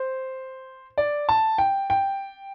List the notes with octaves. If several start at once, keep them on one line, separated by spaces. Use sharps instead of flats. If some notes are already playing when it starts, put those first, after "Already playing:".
Already playing: C5
D5
A5
G5
G5